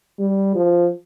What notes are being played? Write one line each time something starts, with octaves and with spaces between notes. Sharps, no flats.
G3
F3